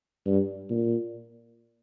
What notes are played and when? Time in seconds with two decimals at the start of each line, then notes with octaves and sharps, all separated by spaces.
0.26 G2
0.70 A#2